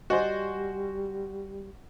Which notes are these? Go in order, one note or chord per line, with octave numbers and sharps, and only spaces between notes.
G3 F#4 C5 D5 D#5 G#5